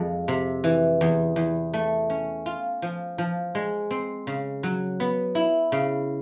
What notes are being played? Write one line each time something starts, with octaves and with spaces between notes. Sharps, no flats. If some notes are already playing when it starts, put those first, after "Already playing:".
Already playing: F2 G#3
C3
E3
E2
E2
A3
C#4
F4
F3
F3
G#3
C4
C#3
F#3
B3
E4
C#3